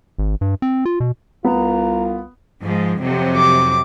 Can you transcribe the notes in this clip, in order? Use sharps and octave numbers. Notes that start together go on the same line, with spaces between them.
G#1
G2
C4
F4
B2
C2 B3 F4 A#5
G#2 F3 G#3
F2 C3 F#3
D6